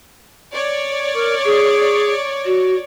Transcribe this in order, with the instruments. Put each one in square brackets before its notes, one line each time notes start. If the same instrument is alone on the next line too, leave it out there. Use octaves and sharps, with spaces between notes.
[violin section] C#5 D5
[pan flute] A#4
G#4
F#4